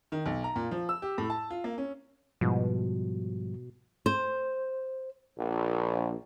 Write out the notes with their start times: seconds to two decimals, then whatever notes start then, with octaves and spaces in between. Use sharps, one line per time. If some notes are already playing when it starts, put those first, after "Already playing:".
0.12 D#3
0.26 B1
0.44 A#5
0.56 A#2
0.71 F3
0.89 E6
1.02 G4
1.18 A2
1.30 A5
1.50 F4
1.64 A#3
1.78 C#4
2.41 G#2 B2 F3 G3
4.06 C5
5.39 A#1